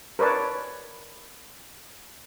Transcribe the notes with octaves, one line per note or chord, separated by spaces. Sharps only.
A#4 B4 C#5 D5 A5